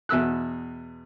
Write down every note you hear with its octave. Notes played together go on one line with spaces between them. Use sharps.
E2 B2 E5 E6 F#6